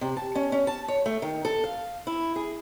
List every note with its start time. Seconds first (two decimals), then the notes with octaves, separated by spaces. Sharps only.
0.01 C3
0.17 A5
0.35 C#4
0.52 C#4
0.67 A5
0.88 C#5
1.06 A3
1.22 D#3
1.45 A4
1.64 F5
2.07 E4
2.36 G#4